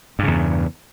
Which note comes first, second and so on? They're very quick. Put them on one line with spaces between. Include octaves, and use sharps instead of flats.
G2 C#3 E2